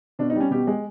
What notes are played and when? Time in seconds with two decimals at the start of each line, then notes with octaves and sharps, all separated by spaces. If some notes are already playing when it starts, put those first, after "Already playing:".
0.19 B2 D4
0.30 D#4
0.35 G3 C#4
0.51 B2 G4
0.67 G#3